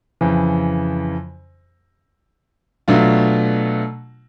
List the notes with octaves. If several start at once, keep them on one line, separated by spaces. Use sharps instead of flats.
F2 C#3 E3
B2 F#3 A3 D4 F4